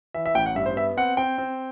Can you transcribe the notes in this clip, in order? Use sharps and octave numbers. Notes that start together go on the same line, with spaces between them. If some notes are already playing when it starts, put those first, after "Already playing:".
E3 E5
E5
A1 G5
F#5
G2 E5
C5
B3 E5
C4 F#5
C4 G5
C4